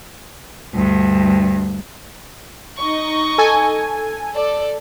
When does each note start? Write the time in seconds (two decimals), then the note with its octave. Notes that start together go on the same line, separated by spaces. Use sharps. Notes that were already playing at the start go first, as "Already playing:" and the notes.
0.74 D2 G2
2.78 D#4 D#5 C#6
3.38 A4 G#5
4.33 A4 D5